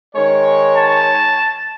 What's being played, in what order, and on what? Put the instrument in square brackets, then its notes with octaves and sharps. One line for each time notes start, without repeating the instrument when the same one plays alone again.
[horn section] D#3 G#3 C#5
[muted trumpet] A5